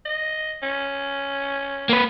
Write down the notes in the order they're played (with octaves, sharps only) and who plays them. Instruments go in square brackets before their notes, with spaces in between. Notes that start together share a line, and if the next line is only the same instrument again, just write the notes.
[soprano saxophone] D#5
C#4
[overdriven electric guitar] A#3 B4